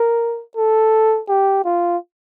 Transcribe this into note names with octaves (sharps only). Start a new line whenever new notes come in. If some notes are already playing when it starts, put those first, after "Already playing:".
Already playing: A#4
A4
G4
F4